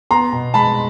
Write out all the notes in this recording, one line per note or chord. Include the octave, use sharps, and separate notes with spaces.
B3 A#5 C6
B2
G#3 A5 B5